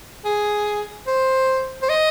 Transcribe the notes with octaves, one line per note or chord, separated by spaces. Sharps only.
G#4
C5
C5
D#5